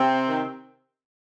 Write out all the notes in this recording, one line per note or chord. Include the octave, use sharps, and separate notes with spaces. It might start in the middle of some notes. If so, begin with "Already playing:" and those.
Already playing: C3 C4
D#3